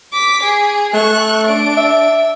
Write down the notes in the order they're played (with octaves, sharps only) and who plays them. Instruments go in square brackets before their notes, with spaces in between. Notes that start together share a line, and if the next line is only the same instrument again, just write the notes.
[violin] D6 B6
G#4
[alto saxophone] A3 [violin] C#6 F#6
[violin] D4 D7
[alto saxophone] E5